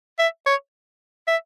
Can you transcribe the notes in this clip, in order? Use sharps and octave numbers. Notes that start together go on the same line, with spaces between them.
E5
C#5
E5